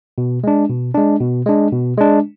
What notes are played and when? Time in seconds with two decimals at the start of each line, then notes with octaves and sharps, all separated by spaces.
0.18 B2
0.44 G#3 D4
0.69 B2
0.94 G#3 D4
1.21 B2
1.46 G#3 D4
1.72 B2
1.98 G#3 D4